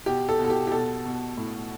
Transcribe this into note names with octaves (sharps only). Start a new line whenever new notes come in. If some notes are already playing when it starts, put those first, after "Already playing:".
B2 G4
A4
B2
A4
G4
G4
B2 A4
B2
A2